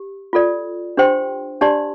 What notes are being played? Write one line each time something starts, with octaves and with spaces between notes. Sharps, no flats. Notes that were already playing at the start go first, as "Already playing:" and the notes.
Already playing: G4
F4 A4 D5
D4 G4 C5 G5 C6
D4 G4 D5 A5 C6